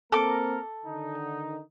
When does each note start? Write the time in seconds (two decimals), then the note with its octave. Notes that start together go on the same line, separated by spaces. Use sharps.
0.12 A#3 C4 A4 A#4 D6
0.86 D3 D#3 D#4